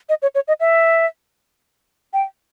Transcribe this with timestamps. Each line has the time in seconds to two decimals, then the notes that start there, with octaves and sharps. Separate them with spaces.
0.09 D#5
0.22 C#5
0.35 C#5
0.48 D#5
0.60 E5
2.13 G5